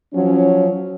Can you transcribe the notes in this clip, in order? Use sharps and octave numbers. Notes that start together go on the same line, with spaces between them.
F3 F#3 C#4